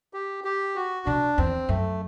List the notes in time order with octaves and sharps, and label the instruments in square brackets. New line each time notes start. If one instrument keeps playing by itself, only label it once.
[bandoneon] G4
G4
F#4
[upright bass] C3 [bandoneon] D4
[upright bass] E2 [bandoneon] C4
[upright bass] F#2 [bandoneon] A3